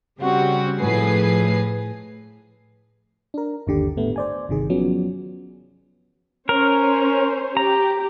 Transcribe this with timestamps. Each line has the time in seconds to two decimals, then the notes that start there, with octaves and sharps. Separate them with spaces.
0.20 C#3 G3 C4 F#4
0.80 A2 F3 G#4 B4 C7
3.34 D4 A#4
3.67 G1 D#2 D3 G4
3.97 A2 A3 B3
4.16 C5 D5 G#5
4.49 G1 C3 D#3 G#4
4.70 F3 F#3 B3 C#4
6.49 C#4 A#4 C5 C#5
7.57 G4 A#5